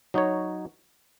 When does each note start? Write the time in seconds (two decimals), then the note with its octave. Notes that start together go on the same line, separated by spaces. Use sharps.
0.14 F#3 D#4 F#4 C#5